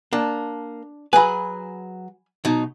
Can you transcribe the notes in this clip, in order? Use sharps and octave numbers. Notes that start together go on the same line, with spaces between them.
A#3 D4 A5
F#3 G#4 B4 G#5 B5
B2 F#3 D#4